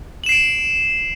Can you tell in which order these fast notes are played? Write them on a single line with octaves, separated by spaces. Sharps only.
F#7 E7 C7 D7